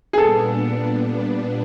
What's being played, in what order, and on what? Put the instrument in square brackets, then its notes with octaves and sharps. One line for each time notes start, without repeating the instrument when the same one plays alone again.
[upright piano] G#4
[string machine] A#2 G3 B3 D4 [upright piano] A4